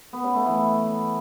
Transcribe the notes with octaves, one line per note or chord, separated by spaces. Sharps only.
B3
C#3
A3
E3